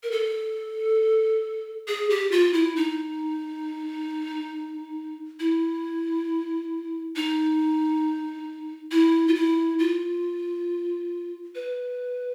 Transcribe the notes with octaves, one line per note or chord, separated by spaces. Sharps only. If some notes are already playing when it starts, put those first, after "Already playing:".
A#4
A4
G#4
G4
F4
E4
D#4
E4
D#4
E4
F4
E4
F4
B4